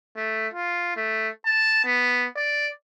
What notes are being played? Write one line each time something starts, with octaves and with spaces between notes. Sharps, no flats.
A3
F4
A3
A5
B3
D5